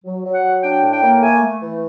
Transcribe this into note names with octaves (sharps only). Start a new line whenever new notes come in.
F#3
F#3
F#5
F#3
D4 G5
A2
G5
A#3
A3 G#5
A3
E3